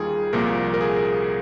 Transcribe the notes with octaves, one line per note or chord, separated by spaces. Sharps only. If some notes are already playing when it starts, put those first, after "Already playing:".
Already playing: D#2 D#3 G3 F4 G#4
C2 A#2 F3 A#3 A#4
A#4
G#4